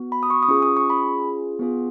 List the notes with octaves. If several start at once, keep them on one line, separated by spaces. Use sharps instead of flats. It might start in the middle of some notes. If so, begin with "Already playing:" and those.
Already playing: B3 F#4
B5
D#6
C#6
D#6
C#4 F4 G#4 C#6
D#6
C#6
B5
B3 F4 G#4